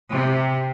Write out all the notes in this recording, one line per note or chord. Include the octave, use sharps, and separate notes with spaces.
C3